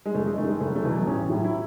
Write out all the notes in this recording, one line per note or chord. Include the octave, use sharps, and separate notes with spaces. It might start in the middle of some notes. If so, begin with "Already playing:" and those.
G#3
F#1 A3
G#3
F#2 D#3 A3
G#3
F#1 A3
A3
E2 B2 F#3
A1 C#4
A2 F#3
E4